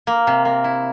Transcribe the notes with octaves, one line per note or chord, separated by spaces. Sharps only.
A#3
C3
A#3
E4